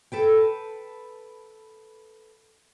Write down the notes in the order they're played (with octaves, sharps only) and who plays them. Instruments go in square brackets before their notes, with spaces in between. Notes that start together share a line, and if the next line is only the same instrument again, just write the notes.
[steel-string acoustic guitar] A4 B4 G5